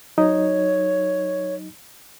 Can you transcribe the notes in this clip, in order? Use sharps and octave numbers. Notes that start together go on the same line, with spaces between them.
F#3 D#4 C#5 D#5